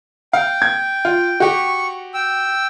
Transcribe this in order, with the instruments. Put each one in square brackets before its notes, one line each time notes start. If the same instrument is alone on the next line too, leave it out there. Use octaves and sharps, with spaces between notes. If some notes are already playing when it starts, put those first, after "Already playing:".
[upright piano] F5 [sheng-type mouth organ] G5
[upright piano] G#6
F4
[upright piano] F#4 G4 [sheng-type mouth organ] C#6
[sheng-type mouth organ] G5 E6